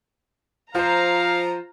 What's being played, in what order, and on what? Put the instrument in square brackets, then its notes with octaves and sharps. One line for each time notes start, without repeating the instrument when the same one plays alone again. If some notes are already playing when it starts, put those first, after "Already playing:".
[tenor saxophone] F3 [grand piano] F4 C5 [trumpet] F5 [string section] A#5